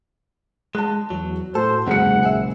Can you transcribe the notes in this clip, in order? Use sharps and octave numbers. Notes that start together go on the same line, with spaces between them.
G#3 A5 F#6
E2 F#3
A2 F#4 A4 C5
F#1 E2 G#2 C3 F#3 G#3 F#5 C#7
A#1 G#4 E5